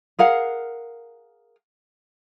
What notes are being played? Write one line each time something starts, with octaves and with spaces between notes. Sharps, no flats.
G#4 A#4 F5 F#5